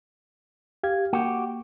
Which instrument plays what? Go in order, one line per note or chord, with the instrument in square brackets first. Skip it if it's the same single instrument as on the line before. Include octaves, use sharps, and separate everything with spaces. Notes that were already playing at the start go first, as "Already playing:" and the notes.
[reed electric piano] G4 F5 G#6
[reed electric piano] A#3 [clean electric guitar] F#4 G4